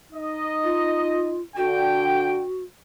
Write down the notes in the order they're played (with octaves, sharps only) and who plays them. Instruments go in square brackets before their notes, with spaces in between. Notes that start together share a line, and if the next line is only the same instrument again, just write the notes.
[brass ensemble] D#4 D#5
[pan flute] F4
[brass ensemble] D3 G5 [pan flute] F#4